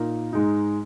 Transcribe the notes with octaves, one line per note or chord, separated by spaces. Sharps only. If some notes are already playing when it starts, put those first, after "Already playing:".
Already playing: A#2 A#3 D#4 A#4
G#2 G#3 D#4